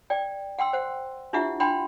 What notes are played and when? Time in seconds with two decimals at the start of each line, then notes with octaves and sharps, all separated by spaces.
0.10 D5 G5
0.59 F#5 G5 C6 E6
0.73 C5 F#5
1.33 D4 E4 F4 G4 E5 F#5
1.60 D4 F#5 G5 B5 C6